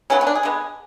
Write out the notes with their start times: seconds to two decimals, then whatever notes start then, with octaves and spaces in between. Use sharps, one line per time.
0.10 C#3 F#3 B3 C#4
0.21 C#4
0.27 D4
0.35 G#4
0.43 D3 G#3 B3